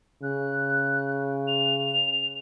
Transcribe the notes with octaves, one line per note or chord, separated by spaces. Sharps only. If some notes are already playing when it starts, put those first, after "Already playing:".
C#3 F#6
F7